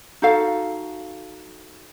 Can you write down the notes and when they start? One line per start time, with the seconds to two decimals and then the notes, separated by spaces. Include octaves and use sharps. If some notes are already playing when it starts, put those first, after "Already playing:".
0.22 D#4 F#4 A4 F5